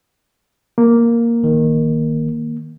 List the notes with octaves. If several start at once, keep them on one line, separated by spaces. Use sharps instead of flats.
A#3
A#1 D#3